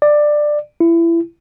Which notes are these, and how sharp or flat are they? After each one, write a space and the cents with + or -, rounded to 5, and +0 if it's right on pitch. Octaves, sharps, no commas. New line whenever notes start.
D5 +15
E4 +25